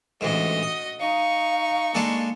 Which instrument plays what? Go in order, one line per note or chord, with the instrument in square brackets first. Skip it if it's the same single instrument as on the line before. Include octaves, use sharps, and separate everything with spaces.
[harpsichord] A1 D2 G#2 [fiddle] F#4 D#5
[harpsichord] D#6
[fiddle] D#4 C#6 [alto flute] F5
[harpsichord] G#3 D4 A4 [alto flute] A#3